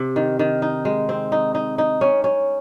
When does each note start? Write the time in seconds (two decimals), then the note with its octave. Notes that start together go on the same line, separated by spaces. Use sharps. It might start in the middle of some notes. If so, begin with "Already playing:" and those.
Already playing: C3
0.16 D#3
0.39 D#3
0.62 D#4
0.85 G#3
1.09 C4
1.32 D#4
1.55 D#4
1.78 D#4
2.01 C#4
2.24 C#4